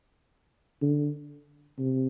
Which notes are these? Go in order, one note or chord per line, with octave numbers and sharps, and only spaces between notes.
D3
C3